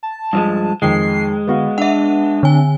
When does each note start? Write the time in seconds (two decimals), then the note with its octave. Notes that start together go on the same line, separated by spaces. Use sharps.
0.03 A5
0.33 G2 F3 G#3
0.82 F2 D#3 G#3 C7
1.47 D3 B3 F#4 F5
1.78 D4 E5 F#5
2.43 D3 G#5